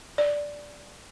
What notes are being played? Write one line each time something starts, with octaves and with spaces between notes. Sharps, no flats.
D5